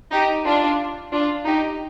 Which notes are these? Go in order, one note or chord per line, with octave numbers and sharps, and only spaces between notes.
D#4 G4
D4 F4
D4 F4
D#4 G4